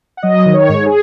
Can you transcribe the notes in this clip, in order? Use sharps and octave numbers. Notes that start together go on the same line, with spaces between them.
F#5
F#3 D#5
D#3
C#5
G#2
G#4